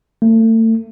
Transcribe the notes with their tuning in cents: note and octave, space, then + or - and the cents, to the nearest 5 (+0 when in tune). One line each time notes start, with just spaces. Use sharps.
A3 +35